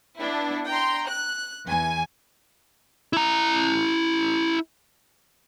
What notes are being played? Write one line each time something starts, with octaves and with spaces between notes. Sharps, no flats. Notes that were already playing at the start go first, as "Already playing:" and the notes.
B3 D4 E4
G5 A#5 C6
F#6
E2 G#5
E4 A#5